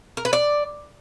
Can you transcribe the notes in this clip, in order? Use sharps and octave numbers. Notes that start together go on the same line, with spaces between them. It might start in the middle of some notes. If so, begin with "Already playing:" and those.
A#4
B4
D5